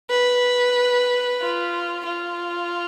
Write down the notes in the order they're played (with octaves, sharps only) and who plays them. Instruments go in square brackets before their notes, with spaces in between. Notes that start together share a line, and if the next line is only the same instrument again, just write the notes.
[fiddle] B4
F4
F4